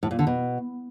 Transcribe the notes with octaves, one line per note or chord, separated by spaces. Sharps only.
A2
A#2
D3
B2